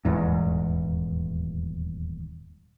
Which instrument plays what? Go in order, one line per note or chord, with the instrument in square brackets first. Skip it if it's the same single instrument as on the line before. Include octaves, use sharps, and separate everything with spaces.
[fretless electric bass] D#1 E2 G#2